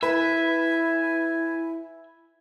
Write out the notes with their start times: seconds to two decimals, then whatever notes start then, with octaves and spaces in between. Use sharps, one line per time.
0.03 E4 B4 E5 G#5